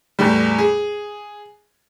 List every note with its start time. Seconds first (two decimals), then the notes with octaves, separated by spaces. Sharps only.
0.19 E2 A2 G3
0.58 G#4